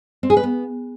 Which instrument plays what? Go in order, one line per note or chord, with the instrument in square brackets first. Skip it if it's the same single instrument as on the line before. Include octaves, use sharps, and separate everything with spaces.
[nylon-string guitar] C4
G#4
B4
B3